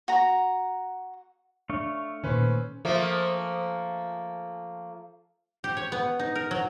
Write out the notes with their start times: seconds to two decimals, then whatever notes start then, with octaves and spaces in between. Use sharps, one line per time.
0.08 F#4 A#5
1.70 A3 D4 C#5 F5
2.24 A#2 D#3 C#4 B4 C5
2.85 F3 A3 A#3
5.64 G4
5.77 C#5
5.92 B3
6.19 D#4
6.35 A#4
6.51 F#3